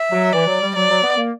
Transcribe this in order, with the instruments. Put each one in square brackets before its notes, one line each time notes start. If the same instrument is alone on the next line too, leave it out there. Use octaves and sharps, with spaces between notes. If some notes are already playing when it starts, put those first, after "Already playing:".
Already playing: [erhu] E5
[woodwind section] F#3
[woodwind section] E3 [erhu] D5
[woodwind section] F#3
G3
[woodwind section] F#3 [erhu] D5
[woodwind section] F#3
B3
A#3